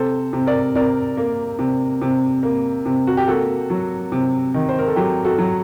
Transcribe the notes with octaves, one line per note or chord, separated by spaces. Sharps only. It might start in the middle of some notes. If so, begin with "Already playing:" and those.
Already playing: C3 A4 C5
C3
A#4 D5
C3 A#4 D5
A#3
C3
C3
A#3
C3
F#4
G4
A#3 F#4 A4
F#3
C3
D#3
C5
A#4
A4
F#3 G4
F#4 A4
F#3